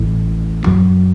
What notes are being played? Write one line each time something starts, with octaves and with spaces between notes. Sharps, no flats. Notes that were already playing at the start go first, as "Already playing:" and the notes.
Already playing: A1 A2
F#2 F#3